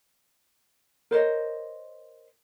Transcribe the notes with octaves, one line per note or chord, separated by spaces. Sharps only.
A#4 C5 C#5 D#5